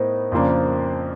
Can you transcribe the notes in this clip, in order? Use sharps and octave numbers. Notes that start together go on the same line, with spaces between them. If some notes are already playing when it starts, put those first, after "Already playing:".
Already playing: A2 B3 D#4 A#4 C5
F2 C#3 F3 A#3 D4